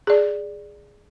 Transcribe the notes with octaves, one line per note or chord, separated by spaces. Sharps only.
G#4 D5